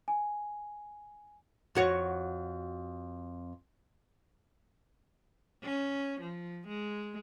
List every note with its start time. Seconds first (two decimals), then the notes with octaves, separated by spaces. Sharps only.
0.08 G#5
1.75 F2 F#4 C#5
5.63 C#4
6.21 F3
6.68 G#3